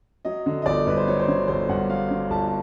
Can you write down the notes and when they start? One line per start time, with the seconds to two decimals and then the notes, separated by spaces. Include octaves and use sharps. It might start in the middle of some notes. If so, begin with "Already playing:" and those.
0.25 F#3 D#5
0.46 D3
0.62 D#5
0.66 G1 D5
0.86 G2 B4
0.97 C5
1.08 F#3 C#5
1.20 C5
1.28 D3 C#5
1.48 G1 C5
1.68 G2 F#5
1.89 F#3 F5
2.11 D3
2.30 G1 A5